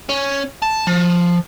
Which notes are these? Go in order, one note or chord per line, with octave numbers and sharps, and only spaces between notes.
C#4
A5
F3